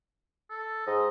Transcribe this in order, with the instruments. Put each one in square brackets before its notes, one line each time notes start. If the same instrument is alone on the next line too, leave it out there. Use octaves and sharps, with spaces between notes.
[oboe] A4
[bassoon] G#2 [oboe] D#5